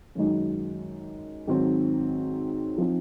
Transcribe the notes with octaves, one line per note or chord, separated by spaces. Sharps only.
F#2 D#3 G#3 D#4 F#4
G#2 D#3 F#3 C4
F3 C4 D#4